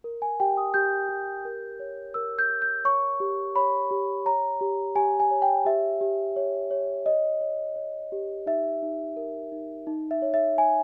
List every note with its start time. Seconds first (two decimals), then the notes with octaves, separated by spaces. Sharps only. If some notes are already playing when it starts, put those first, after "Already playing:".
0.04 A#4
0.22 G#5
0.40 G4 G5
0.57 D#6
0.74 G4 G6
1.09 G4
1.45 A#4
1.80 C#5
2.14 A#4 E6
2.39 G6
2.50 A#4
2.62 G6
2.85 C#5 C#6
3.20 G4
3.56 C#5 B5
3.91 G4
4.26 C#5 A#5
4.61 G4
4.96 G4 G#5
5.20 G#5
5.31 C#5
5.42 G5
5.65 G4 E5
6.01 G4
6.36 C#5
6.71 C#5
7.06 C#5 D#5
7.41 C#5
7.76 C#5
8.12 G4
8.46 D#4 E5
8.83 D#4
9.17 A#4
9.52 D#4
9.87 D#4
10.11 E5
10.22 C#5
10.34 E5
10.57 C#5 G#5